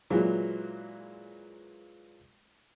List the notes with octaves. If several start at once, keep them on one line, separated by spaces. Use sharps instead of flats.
A#2 E3 F#3 G#3